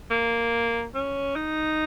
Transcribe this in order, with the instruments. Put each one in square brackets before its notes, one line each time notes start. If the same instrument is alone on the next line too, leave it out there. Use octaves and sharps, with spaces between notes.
[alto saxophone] A#3
C#4
D#4